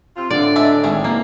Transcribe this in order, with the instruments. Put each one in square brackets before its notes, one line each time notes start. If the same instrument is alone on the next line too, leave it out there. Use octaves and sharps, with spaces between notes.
[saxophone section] C3 C4 F4
[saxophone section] A2 [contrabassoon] D3 [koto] D5
[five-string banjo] G#3 D4 E5
[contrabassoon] G#1 [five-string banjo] G3 A3 G#4
[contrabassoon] F#1 [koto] A#3